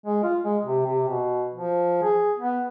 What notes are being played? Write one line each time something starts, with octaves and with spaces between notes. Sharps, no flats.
G#3
F4
G#3
C3
C3
B2
F3
G#4
B3